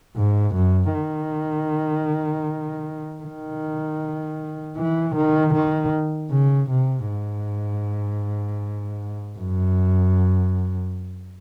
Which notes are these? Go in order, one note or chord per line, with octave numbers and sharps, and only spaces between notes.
G#2
F#2
D#3
D#3
E3
D#3
D#3
C#3
C3
G#2
F#2